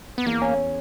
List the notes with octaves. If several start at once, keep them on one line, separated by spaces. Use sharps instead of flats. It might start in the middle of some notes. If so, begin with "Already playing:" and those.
B3
E2 A#3
C#4